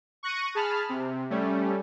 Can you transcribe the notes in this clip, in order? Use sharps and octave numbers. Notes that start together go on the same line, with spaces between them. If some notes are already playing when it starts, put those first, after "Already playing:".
C#6 F#6 A#6 C#7 D#7
G#4 A5 B5 F6
C3
G3 A3 C#4